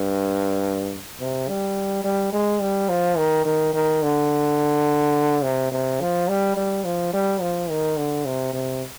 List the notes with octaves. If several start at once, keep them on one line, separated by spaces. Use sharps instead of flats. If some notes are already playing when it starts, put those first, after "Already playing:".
Already playing: G2
C3
G3
G3
G#3
G3
F3
D#3
D#3
D#3
D3
C3
C3
F3
G3
G3
F3
G3
F3
D#3
D3
C3
C3